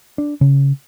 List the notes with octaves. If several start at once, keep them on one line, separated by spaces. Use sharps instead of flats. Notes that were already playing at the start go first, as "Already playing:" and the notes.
D4
C#3